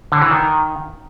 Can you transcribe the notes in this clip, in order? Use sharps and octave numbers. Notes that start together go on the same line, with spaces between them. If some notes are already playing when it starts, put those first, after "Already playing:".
D3
E3
D#3